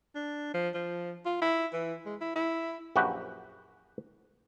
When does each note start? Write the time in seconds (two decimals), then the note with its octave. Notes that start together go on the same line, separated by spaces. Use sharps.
0.15 D4
0.54 F3
0.74 F3
1.26 F4
1.42 E4
1.73 E3
2.06 G#3
2.21 E4
2.36 E4
2.96 A#1 F#2 F#4 G4 B4 F#5